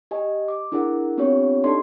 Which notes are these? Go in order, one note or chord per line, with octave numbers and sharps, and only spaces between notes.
G4 D#5 G#5
D6
D4 E4 G#4 A#4 F#5
B3 C4 D4 F4 G4 C#5
D4 D#4 G4 A4 D5 C6